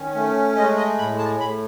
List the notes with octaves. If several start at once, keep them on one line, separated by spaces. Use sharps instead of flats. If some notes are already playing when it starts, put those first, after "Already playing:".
Already playing: D#3 C#4
A3
G#3 D#5
D#5
A2 B5
A5
A2 B5